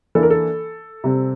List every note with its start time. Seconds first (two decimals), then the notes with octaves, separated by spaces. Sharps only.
0.15 E3 A#3 D4 A4
0.23 A#4
0.30 A4
1.04 C3 G3 C4